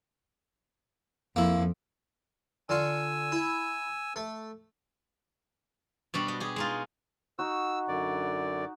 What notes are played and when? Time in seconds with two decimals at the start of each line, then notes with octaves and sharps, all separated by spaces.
1.36 F2 A#3 E4
2.69 D3 F4 G#5 C#6 E6
3.32 E4
4.16 A3
6.14 B2 G3 D4 F#4
6.28 G4 D#5
6.40 G4 G#4
6.56 G#3 D#4 F4
7.39 D#4 F#4 E6
7.88 F#2 D3 D5